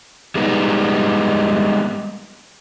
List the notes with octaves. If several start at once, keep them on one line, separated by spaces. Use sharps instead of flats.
G3 G#3 B3 D#4